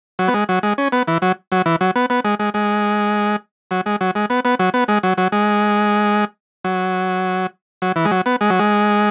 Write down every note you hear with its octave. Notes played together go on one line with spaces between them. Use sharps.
F#3
B3
G#3
F#3
G#3
C#4
B3
E3
F#3
F#3
E3
F#3
B3
B3
G#3
G#3
G#3
F#3
G#3
F#3
G#3
B3
B3
F#3
B3
G#3
F#3
F#3
G#3
F#3
F#3
E3
G#3
F#3
B3
G#3
F#3
G#3